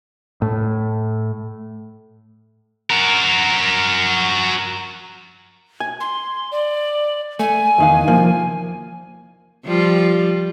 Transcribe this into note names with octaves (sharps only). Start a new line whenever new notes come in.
A2
F#4 A#4
G#5
C6
D5
A3 G#5
E2 D#3 F5
C2 F3 A#3
F3 G3 F4